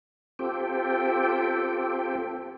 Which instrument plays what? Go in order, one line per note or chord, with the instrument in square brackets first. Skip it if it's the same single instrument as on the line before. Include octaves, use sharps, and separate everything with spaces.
[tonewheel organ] C4 F4 G4 A4 G5